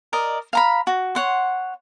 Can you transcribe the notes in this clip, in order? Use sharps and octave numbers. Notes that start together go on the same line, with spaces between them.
A#4 D5 D#5
F5 A#5 B5
F#4
C#5 F#5 C6